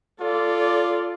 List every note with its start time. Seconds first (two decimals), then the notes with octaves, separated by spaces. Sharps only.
0.20 F4 A4 D5